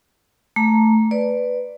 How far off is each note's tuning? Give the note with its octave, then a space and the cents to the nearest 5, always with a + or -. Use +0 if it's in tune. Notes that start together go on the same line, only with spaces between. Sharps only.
A3 +0 A#5 +0
B4 +15 D5 +0